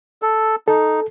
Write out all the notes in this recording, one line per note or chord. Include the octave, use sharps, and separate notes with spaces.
A4
D#4 A4